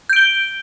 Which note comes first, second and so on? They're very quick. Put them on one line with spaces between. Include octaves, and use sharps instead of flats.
G6 D7 G7